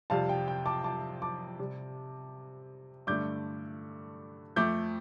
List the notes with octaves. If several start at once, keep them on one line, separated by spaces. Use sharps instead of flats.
F2 C3 G3 F5 A5
G5
G5
A5 D6
A5 D6
A5 D6
C3 G3
G2 D3 A3 D6 G6
F2 F3 A3 D6 G6